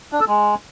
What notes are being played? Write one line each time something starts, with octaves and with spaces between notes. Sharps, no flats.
D4
A4
G#3